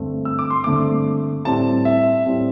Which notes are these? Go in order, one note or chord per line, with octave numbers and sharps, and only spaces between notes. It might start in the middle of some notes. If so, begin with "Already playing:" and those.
Already playing: G2 D3 A3 C4
E6
D6
C6
G2 D3 A3 C4 D6
A2 G3 C4 A5
E5
A2 G3 C4